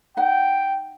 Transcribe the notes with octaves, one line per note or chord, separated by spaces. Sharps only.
D#4 F#5 G5